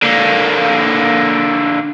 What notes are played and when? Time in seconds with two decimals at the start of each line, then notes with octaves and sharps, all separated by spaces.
0.03 D3 A#3